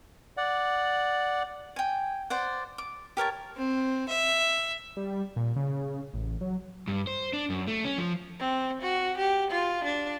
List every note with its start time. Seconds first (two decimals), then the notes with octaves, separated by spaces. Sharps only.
0.37 D5 F#5
1.76 G5 G#5
2.30 C5 D5 F#5
2.78 D6
3.17 G4 A#4 C#5 A5
3.57 C4
4.08 E5
4.97 G3
5.36 A#2
5.56 C#3
6.14 A1
6.41 F#3
6.88 G2
7.07 C5
7.33 D4
7.50 F#2
7.67 A3
7.85 C#4
7.98 F3
8.40 C4
8.82 F#4
9.18 G4
9.51 F4
9.84 D4